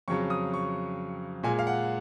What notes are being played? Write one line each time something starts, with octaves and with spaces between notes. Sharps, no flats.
F2 C#3 F#3 C#6
D#6
C#6
A#2 G#3 G#5
F5
F#5